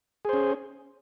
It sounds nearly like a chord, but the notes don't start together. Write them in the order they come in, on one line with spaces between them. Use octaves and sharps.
G#4 C5 C#4